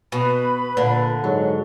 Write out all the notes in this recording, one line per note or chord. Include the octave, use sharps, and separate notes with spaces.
B2 B4 B5
A#2 D3
G#2 F#3